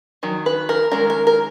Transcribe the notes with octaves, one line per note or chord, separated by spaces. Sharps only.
D#3 F#3
B4
A#4
D#3 G#3 C#4 A#4
A#4
A#4